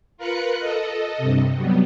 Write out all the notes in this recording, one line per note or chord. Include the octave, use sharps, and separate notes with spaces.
F4 A#4 B4 F#6 C#7
A4 D#5
G2 C3
F#3 G3 B3